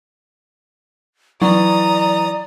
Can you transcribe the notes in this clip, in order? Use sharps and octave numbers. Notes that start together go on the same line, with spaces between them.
E3 F#3 D5 A#5 D#6